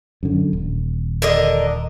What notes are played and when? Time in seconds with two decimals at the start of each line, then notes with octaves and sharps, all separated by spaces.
0.23 F#2 D3
0.53 D#1
1.22 D3 A#4 D#5